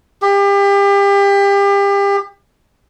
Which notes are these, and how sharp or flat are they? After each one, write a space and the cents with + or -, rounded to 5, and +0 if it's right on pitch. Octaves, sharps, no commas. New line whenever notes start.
G4 +30